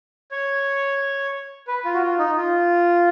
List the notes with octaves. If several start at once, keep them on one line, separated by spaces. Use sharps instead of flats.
C#5
B4
F4
F#4
F4
D#4
F4